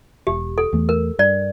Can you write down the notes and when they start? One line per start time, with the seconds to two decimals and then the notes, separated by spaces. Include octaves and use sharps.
0.27 E1 G4
0.58 A4
0.73 E2 E3 A3
0.89 A#4
1.19 G2 D5